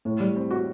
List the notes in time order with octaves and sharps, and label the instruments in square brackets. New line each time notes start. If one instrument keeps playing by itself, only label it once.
[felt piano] A2
G3
C4
F#4